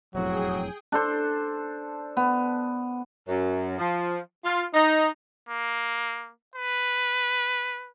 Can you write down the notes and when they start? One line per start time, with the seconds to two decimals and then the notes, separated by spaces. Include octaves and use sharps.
0.15 E1 F2 A2 F#3 F#4 G#4 G5 D#6
0.92 D4 A4 C5
2.17 B3
3.28 F#2
3.78 F3
4.45 F4
4.74 D#4
5.49 A#3
6.55 B4